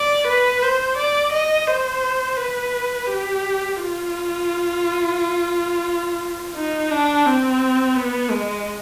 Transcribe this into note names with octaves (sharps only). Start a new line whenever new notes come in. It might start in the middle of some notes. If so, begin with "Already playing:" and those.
Already playing: D5
B4
C5
D5
D#5
C5
B4
G4
F4
D#4
D4
C4
B3
G#3